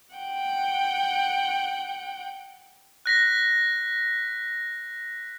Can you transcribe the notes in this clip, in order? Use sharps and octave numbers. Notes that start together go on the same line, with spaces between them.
F#5 G5
F#6 A#6 B6